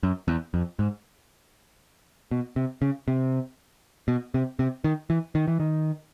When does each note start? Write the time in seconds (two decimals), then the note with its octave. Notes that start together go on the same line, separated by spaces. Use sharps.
0.03 F#2
0.28 E2
0.54 F2
0.79 G#2
2.31 B2
2.56 C3
2.82 C#3
3.08 C3
4.08 B2
4.34 C3
4.59 C3
4.84 D#3
5.10 E3
5.35 D#3
5.48 E3
5.60 D#3